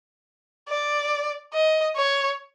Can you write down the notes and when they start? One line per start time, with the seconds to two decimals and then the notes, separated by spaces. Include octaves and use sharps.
0.69 D5
1.53 D#5
1.96 C#5